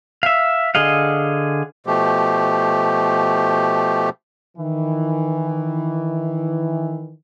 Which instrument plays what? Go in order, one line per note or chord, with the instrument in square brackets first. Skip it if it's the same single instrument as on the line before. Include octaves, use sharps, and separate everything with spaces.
[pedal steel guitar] E5 F5
D3 G#4 D#5 F5
[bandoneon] B2 F3 A3 G4
[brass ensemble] D#3 E3